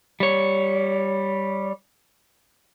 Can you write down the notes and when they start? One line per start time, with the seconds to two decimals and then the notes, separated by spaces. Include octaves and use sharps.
0.20 G3 C#5